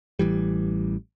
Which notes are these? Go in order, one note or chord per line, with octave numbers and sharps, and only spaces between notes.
A1 E3 G3